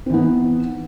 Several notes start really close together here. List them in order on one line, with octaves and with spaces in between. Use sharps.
C4 E3 B3 D#4